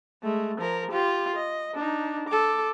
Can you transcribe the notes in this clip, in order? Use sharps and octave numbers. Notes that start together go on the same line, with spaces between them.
G#3 A3
F3 A#4
F4 G4
D#5
D4 D#4
A4 D6